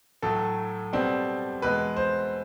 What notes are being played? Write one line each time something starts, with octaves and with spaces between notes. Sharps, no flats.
A2 F#3 A3 A4
B2 G3 C4
E2 B2 G#3 B4
C5